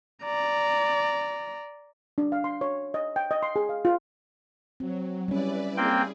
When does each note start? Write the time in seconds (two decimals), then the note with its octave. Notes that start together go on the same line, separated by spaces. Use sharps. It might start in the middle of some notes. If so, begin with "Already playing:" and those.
0.24 D5 A#5
2.18 D4
2.32 F5
2.44 C6
2.61 C#5
2.94 D#5
3.16 G5
3.31 D#5
3.43 C6
3.56 G#4
3.69 F5
3.85 F4
4.80 F#3 C4
5.28 G3 C#4 E4 B4 D5
5.77 A#3 C4 G#4 G5